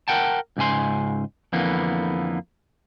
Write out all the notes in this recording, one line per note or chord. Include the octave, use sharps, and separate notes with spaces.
A#4 F#5 G5 A5
C#2 G#2 C#3 G#5 C6
F2 D3 E3 A#3 B3